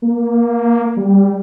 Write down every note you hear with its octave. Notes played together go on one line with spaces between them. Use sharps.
A#3
G3